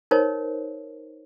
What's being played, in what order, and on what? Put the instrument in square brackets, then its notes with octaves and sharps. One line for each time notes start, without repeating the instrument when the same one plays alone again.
[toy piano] D#4 A#4 C5 C#5